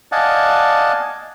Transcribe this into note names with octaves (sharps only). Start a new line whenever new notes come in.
D5 D#5 F5 F#5 G#5 A5